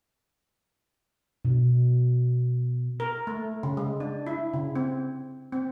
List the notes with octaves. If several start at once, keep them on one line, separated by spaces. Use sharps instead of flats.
B2
A#4
A3
C#3
G#3
D4
E4
C#3
C4
C4